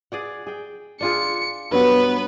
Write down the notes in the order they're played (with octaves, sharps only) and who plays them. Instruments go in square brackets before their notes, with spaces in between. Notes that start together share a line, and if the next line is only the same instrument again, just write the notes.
[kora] G#4 D5 F#5
G#4 G5
[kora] D4 F4 G#4 [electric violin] C#7
[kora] G2 F#3 [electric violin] B3 B4